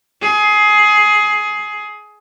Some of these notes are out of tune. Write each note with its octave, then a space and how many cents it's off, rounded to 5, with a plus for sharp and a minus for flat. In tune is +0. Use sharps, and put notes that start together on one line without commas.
G#4 +20